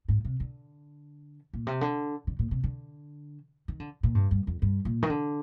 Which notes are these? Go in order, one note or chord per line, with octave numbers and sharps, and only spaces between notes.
G#2
C3
D3
A#2
C3
D3
D3
A#2
C3
D3
D#3
D3
A#2
G2
G2
F2
G2
A#2
D#3
D3